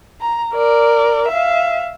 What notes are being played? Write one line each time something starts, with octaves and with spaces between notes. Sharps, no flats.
A#5
A#4 D5
E5 F5